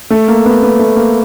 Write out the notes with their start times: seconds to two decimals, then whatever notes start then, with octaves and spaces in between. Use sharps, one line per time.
0.10 A3
0.28 A#3
0.46 B3
0.63 B3
0.79 A3
0.96 A#3